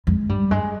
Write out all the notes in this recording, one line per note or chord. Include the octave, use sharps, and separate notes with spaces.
F2 G#3
G2 G3
G2 G#3